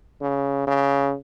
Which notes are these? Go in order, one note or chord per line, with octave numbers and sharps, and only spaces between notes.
C#3
C#3